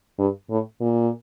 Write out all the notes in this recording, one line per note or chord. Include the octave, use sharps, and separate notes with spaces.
G2
A2
A#2